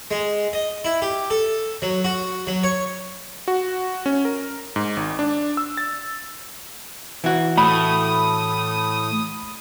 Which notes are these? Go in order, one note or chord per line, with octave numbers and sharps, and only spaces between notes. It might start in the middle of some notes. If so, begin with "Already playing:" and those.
G#3
D#5
E4
G4
A4
F#3
F#4
F#3
C#5
F#4
C#4
A#4
G#2
G#1
D4
E6
A6
E3 F#4
A2 B5 D#6